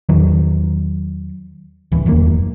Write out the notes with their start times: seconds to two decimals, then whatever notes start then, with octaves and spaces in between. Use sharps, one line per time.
0.09 E2 D#3 F#3
1.92 D1 E3
2.06 E1 F#2 D#3 A#3